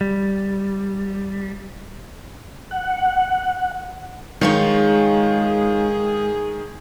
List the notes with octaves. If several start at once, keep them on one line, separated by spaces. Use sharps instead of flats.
G3
F#5
D#3 G#3 D#4 F4 G#4 C#5